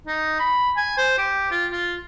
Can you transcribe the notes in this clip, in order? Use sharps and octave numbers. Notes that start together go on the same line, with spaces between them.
D#4
B5
G#5
C5
G4
F4
F4